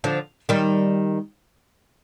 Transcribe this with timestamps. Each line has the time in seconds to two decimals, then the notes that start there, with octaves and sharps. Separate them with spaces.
0.04 D3 F3
0.49 D#3 G3